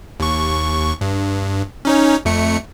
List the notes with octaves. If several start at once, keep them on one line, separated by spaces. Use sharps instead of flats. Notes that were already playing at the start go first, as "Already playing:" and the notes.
D#2 C#6
G2
C#4 D#4 C#5
F2 A3 C#7